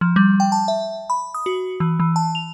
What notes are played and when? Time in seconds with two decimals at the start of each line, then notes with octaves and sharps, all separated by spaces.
0.01 F3
0.16 G3
0.40 G5
0.52 A5
0.68 E5
1.10 B5
1.34 D#6
1.46 F#4
1.80 E3
2.00 E3
2.16 A5
2.35 F7